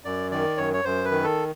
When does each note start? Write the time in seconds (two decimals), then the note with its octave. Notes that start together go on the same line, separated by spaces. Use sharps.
0.04 F#2 D5
0.32 D#3 D5
0.57 F#2 C#5
0.74 C#5
0.84 F#2 C5
1.05 B4
1.11 D#3
1.24 A4